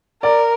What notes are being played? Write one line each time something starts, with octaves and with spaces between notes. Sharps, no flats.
A#4 D5